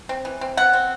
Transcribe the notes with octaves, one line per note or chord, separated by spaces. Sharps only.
C4
E3
C4
B2 F#5
C4